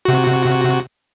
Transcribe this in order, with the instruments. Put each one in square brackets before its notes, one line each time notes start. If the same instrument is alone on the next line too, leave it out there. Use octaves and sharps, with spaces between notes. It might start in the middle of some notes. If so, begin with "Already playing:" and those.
[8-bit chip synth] C3 F#4